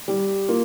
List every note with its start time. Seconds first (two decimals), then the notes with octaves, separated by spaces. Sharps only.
0.08 G3
0.48 A#3 F4